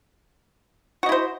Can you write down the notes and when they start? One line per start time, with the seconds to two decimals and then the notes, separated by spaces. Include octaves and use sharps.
1.03 F#4
1.06 D#5
1.09 E4
1.12 C5